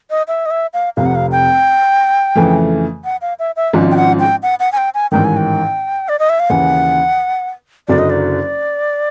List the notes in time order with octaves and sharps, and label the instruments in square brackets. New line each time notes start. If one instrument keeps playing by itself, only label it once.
[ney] D#5
E5
D#5
E5
F5
[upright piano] F1 F2 C3 [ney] F5
[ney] F#5
F5
G5
[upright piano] F2 C#3 E3 A3
[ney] F#5
F5
E5
E5
[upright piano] G#1 G#2 F3 G#3 C#4
[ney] G5
F#5
G5
F#5
F#5
G#5
G5
G#5
[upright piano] A1 G#2 D#3 [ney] G5
[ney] G#5
G5
D5
D#5
E5
F5
[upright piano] D#2 C#3 E3 [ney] F#5
[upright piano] F#1 F#2 D3 F#3 [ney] D5
[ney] D#5
D5